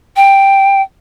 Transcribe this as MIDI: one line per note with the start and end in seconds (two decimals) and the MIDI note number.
0.16 0.82 79